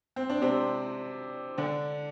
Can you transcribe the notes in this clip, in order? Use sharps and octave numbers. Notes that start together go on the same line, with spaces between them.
C4
D4
C3 C4
D3 D4